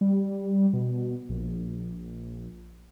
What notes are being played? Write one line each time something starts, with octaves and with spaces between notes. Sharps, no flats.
G3
B2
A#1